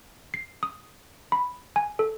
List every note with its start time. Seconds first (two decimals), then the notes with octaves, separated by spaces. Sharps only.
0.34 C7
0.63 D#6
1.32 B5
1.76 G#5
1.99 A4